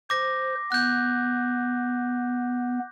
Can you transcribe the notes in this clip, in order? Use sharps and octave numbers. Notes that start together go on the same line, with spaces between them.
C5 D6 A#6
B3 F#6 G6